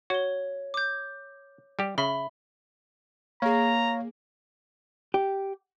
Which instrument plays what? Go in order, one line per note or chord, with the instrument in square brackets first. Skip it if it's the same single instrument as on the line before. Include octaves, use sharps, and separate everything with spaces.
[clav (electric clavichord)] F#4 [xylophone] C#5 G7
[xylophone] D6 G6
[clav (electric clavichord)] G3 G4
[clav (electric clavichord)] C#3 [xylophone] E5 B5 G7
[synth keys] A#3 G#4 [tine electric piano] C#5 F5 [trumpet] A#5
[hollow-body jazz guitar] G4